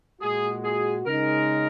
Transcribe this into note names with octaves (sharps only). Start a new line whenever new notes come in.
A#2 G#3 F#4 G#4
G#4
C#3 G#3 D#4 A#4